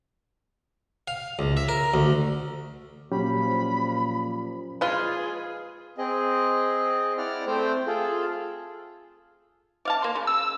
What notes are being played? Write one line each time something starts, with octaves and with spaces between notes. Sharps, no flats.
F5
C#2
E5
A#4
D2
A#2 F3 F#3 C#4 G4 B5
G#3 F4 G#4 B4
C4 G#4 D#5
E4 D5 F#5 F6
A3 C4 C5 G5
F4 G#4 A4
D5 F5 A5
A#3 C6
C#3
E6